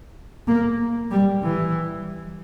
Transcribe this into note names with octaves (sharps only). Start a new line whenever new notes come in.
A#3
G3
E3